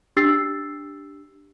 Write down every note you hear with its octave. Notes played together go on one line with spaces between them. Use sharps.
D4 G4 E6 A6 C7